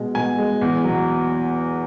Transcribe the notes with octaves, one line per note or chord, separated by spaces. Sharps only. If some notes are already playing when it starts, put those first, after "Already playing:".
Already playing: B2 G#3
B2 G#5
G#3
E2
B2 F#3